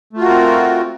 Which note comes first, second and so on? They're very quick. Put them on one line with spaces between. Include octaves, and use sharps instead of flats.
A3 F4 F#4 A#4 C4